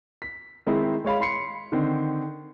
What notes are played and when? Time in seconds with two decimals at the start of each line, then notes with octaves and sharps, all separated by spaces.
0.22 B6
0.67 D#3 G#3 C4 D#4 E4
1.04 G#3 C#5 F5 B5
1.20 B5 C6 C7 C#7
1.72 D3 D#3 C4